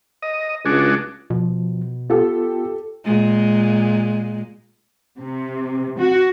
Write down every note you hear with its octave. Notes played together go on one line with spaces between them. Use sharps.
D#5
C#2 G#3 D4 F#4
B2 F3
B3 F4 G4 A4
A#2 G#3
C3
F#4